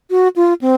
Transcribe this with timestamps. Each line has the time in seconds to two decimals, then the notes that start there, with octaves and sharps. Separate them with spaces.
0.10 F#4
0.36 F4
0.61 C4